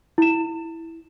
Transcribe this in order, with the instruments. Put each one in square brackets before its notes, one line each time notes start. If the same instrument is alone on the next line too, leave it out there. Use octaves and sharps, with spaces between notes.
[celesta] E4 E7